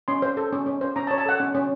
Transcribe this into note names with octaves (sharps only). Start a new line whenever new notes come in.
C#4 C6
C5
A4
C#4
C#4
C5
C#4 A#5
A5
C#5
A5
A4 F#5
C#4
C#4